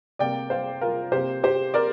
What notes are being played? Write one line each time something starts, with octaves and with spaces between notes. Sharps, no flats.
C3 A#3 D5 G5
C5 F5
F4 A#4
C3 A#3 G4 C5
G4 C5
A#4 D5